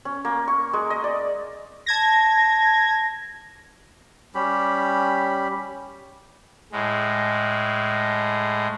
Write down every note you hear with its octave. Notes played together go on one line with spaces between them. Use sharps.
C#4
A#3
C#6
G#3
D#5
D5
A5 G#6 A#6
G3 C#4 G4 B5
A2 G#3